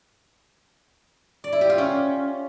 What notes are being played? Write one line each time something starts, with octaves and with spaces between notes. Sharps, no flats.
D5
E4
G4
F4
C#4